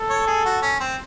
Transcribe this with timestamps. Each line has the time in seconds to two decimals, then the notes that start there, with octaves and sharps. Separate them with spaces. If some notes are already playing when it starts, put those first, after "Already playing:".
Already playing: A4
0.10 C#5
0.27 G#4
0.45 F#4
0.62 C#4
0.80 C4